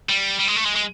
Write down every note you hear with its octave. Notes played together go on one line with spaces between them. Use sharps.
G3
G3
G#3
A3
G#3
G#3